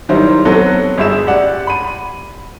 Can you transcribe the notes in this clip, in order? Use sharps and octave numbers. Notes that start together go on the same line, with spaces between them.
D#3 F#3 G3 E4 C5
F#3 B3 C4 F#4 A4
G1 G#3 E5 E6 E7
G4 D5 F#5
B5 D#7